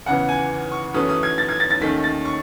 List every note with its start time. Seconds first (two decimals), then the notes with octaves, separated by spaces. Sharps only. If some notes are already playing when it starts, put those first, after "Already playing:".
0.06 E2 C#3 E3 F#5
0.29 G#5
0.72 C#6
0.94 F#2 E3 A3 C#4 D#6
1.09 D#6
1.23 G#6
1.38 A6
1.49 G#6
1.60 A6
1.70 A6
1.81 D#2 D#3 A3 C#4 B6
2.04 A6
2.25 C#6